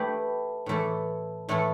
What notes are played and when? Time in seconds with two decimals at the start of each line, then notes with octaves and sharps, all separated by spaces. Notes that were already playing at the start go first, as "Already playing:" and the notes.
Already playing: A3 E4 G4 B4
0.66 A2 E3 A3 E4 A4
1.49 A2 E3 A3 E4 A4